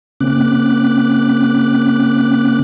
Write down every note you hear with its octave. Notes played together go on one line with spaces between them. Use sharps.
C#3 A#3 C4 C#4 D6 F#6